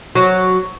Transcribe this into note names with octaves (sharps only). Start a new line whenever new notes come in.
F#3